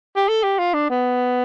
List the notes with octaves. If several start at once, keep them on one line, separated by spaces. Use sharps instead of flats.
G4
A4
G4
F4
D4
B3